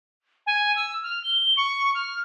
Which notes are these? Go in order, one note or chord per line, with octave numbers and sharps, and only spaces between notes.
G#5
E6
F6
G7
C#6
F6